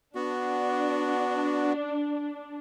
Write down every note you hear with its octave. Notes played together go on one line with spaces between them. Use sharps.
B3 D4 F#4